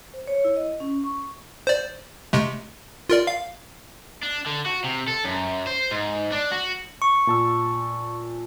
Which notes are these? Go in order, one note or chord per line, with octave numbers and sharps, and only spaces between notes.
C5
C#5
E4
D#5
C#4
C#6
C5 D5
C3 G#3 A3
F4 A#4 D5
F5
D4
D3
F#4
C3
A4
F#2
C5
G#2
D4
F#4
C#6
A#2 A5 E6